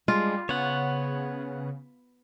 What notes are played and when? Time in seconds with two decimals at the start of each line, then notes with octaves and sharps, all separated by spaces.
0.08 G3 G#3 D4 F4
0.49 C#3 B3 C#5 F#5